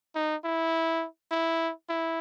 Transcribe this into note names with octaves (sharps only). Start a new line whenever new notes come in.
D#4
E4
E4
E4